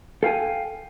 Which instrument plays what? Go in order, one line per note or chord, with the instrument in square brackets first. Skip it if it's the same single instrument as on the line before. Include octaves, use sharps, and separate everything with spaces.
[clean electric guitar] A4 F5 G5 G#5